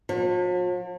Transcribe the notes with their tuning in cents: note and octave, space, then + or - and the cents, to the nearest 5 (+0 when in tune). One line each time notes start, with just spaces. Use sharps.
F3 +45